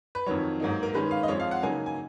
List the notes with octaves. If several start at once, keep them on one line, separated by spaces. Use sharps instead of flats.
B4
F2 D#3 F#3 C#5
G#2 F#3 A#3 D#4
A#4
D#3 G#3 C#4 B4
F5
D#5
F2 F3 G#3 C#5
F5
F#5
C#3 F#3 A#3 D#4 G#5
G#5